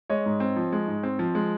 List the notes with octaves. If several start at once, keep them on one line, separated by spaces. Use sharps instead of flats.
G#3 C#5 D#5
G#2
C4
F3
G#3
G#2
C4
F3
G#3